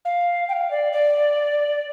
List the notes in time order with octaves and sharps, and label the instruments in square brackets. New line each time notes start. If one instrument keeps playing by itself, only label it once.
[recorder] F5
G5
F5
D5
D5